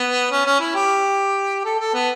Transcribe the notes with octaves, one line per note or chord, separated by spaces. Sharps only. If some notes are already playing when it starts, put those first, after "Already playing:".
Already playing: B3
C#4
C#4
E4
G4
A4
A4
B3